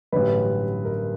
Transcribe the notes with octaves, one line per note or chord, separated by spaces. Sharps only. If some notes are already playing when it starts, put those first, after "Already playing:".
A1 G2 D3 F#3 B4
A#4